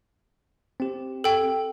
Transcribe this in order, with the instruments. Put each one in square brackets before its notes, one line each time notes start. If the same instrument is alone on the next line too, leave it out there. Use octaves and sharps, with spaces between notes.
[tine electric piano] C4 G4
[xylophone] A4 G5